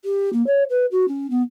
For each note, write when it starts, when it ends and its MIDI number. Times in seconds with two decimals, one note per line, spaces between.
0.04 0.29 67
0.33 0.44 58
0.46 0.63 73
0.69 0.86 71
0.91 1.05 66
1.08 1.29 61
1.30 1.42 59